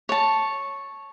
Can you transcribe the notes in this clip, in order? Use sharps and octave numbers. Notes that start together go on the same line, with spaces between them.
C#5 A5